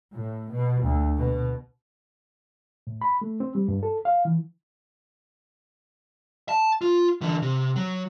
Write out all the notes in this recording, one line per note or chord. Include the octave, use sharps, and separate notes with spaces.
A2
B2
D2
B2
A2
B5
A3
C4
G3
G2
A4
F5
E3
A5
F4
D3 E3
C3
F#3